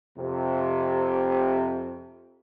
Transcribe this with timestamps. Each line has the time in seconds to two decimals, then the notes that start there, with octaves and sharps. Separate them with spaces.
0.16 F2 C3